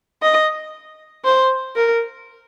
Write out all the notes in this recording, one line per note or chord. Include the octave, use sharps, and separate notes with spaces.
D#5
C5
A#4